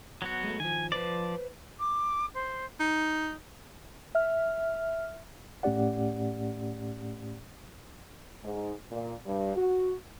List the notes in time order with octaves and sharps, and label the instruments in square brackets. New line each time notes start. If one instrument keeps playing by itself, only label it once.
[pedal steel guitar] F#3 B3 F#4
[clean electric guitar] G#3 A3
[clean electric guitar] D#3 F3 [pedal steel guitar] G#5
[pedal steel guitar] F3 D5 [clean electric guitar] B4 C5
[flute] D6
C5
[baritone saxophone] D#4
[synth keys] E5 F6
[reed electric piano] A2 A3 C#4 G4 D5 F#5
[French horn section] G#2
A#2
G2
F#4